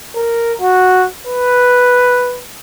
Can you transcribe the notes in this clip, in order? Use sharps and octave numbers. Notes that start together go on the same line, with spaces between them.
A#4
F#4
B4